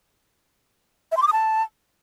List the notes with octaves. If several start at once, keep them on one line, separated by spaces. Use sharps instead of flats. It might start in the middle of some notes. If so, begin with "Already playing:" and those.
E5
C6
D6
D#6
A5